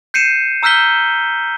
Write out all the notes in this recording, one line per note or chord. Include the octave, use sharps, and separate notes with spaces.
G6 C7 C#7 D#7 E7
A#5 E6 F6 G6 B6 G7